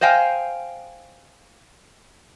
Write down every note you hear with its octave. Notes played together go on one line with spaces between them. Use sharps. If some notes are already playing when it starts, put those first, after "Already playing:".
C5 D#5 F5 G5 G#5